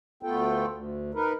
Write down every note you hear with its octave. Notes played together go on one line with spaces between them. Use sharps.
D2 A3 B3 F4 A4 G5
D2
D#4 A#4 B4